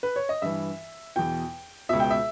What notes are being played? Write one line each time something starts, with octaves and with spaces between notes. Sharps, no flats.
B4
C#5
D#5
G2 E3 E5
E2 B2 G5
C#2 B2 E5
G5
E5